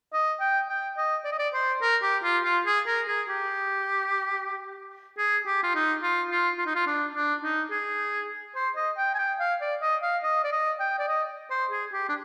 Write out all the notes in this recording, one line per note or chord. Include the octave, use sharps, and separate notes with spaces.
D#5
G5
G5
D#5
D5
D#5
D5
C5
A#4
G4
F4
F4
G#4
A#4
G#4
G4
G#4
G4
F4
D#4
F4
F4
F4
D#4
F4
D4
D4
D#4
G#4
C5
D#5
G5
G#5
G5
F5
D5
D#5
F5
D#5
D5
D#5
G5
D5
D#5
C5
G#4
G4
D4